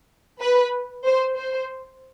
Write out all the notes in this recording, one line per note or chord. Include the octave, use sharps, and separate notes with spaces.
B4
C5
C5